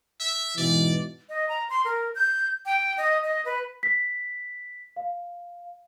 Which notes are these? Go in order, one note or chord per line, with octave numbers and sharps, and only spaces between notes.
E5
G#2 B2 E3 D5
D#5
A#5
C6
A#4
G6
G5
D#5
D#5
B4
B6
F5